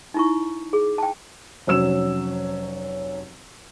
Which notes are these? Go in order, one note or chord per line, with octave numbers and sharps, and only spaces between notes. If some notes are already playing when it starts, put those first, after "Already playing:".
D#4 E4 C#6
G#4
G5 A5
F1 F#3 C#4 E6 E7